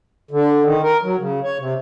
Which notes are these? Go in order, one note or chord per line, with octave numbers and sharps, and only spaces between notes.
D3
D#3
A#4
F#3
C#3
C#5
C3